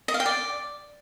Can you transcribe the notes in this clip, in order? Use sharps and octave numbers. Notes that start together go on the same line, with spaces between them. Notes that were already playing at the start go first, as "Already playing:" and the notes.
D#5
F5
G5
D5